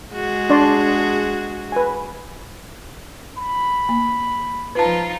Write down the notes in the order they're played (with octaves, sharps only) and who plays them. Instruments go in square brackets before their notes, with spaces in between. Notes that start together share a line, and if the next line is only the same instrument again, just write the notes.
[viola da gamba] G#3 F#4 G#4
[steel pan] D4 D5 C6
B4 G#5
[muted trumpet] B5
[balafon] A#3
[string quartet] F3 D#4 F4 [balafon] B4 A5